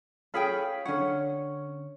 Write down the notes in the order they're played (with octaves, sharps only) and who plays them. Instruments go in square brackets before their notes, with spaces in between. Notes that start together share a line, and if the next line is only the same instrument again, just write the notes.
[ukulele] C#4 G#4 G5 [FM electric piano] A4 F5 B5
[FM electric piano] D3 C#5 [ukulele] C#4 F#5